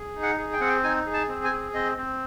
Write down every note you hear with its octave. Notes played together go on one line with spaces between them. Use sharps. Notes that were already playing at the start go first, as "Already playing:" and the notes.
Already playing: G#4
D#4
F#5
G#4
G5
C4 F#5
G5
D#4 G#5
G#4
A5
C4
G#5
G#4
C4 D#5
C4